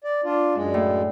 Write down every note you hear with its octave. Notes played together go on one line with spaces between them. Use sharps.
D5
D4 F4
F#2 G#3 D4
A2